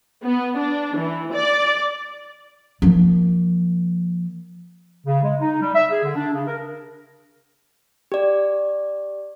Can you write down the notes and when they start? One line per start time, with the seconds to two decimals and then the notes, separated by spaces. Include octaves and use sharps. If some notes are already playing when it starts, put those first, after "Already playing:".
0.24 B3
0.57 D4
0.97 E3
1.33 D5
2.82 F3 A#3
5.05 C#3
5.23 G#3
5.40 D#4
5.61 G3
5.74 E5
5.90 G#4
6.04 D3
6.16 D4
6.34 C#3
6.47 A#4
8.12 G4 D5